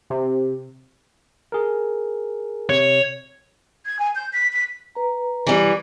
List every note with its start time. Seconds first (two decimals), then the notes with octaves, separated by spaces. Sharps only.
0.10 C3
1.52 G#4 A#4
2.69 C3 C#5
3.86 G#6
3.99 G#5
4.15 G6
4.33 B6
4.53 B6
4.95 B4 A#5
5.47 E3 G3